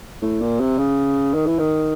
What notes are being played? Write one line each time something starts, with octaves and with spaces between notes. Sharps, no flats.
A2
A#2
C3
C#3
D#3
E3
D#3